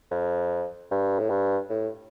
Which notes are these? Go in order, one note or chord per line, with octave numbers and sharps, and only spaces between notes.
F2
G2
A2
G2
A2